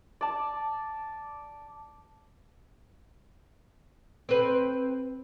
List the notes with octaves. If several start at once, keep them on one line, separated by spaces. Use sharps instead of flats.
D5 A5
C4 B4